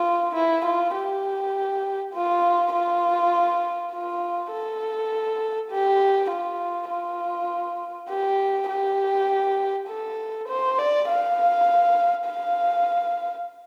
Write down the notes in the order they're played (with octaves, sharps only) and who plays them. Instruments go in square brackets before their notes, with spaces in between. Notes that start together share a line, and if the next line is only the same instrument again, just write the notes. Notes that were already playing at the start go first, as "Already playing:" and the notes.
Already playing: [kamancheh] F4
E4
F4
G4
F4
F4
F4
A4
G4
F4
F4
G4
G4
A4
C5
D5
F5
F5